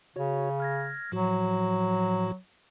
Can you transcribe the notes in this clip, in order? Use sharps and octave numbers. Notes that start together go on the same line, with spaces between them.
C#3 F#4 C#5
F6 G#6 A#6
A2 F3 F#3 F#4